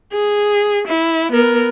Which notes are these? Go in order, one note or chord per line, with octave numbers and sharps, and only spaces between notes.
G#4
E4
B3 A#4